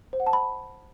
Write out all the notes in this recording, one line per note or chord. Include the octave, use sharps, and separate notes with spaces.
C5
F#5
A5
B5